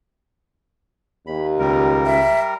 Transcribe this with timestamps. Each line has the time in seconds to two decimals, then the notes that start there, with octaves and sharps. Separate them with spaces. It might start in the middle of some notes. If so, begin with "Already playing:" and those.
1.27 D#2 B5
1.59 C#2 G3 A#4
2.06 E5